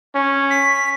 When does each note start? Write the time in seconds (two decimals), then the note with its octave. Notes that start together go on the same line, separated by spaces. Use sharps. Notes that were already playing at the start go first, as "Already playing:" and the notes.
0.15 C#4
0.50 B6